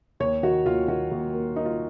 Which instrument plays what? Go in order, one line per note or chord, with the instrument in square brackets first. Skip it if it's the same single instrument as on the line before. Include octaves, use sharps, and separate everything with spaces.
[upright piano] D#2 C#5
D#3 F#4
D#2 F4
D#3 F#4
D#2
A#3
A#3 D#4
F4